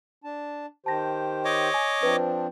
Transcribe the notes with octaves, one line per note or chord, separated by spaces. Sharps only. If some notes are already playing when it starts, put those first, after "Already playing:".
D4 A5
D#3 G4 C5 A5 A#6
C#5 D#5 D6
G#5
F3 C4 D4 B4